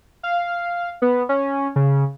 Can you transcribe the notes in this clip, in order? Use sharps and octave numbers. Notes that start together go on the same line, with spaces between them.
F5
B3
C#4
C#3